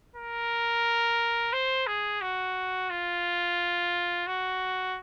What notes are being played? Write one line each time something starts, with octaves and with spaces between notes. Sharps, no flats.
A#4
C5
G#4
F#4
F4
F#4